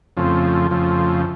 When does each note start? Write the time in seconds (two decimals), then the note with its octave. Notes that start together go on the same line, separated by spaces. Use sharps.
0.17 F2 C#3 F3 A3 C4
0.71 F2 C#3 F3 A3 C4